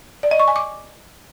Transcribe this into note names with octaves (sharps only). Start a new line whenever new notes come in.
D5
D#5
C#6
G#5
D6